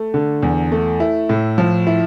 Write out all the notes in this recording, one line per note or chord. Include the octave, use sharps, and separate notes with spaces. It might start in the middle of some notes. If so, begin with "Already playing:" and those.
Already playing: A3
D3
E2
A3
E4
A2
F3
E4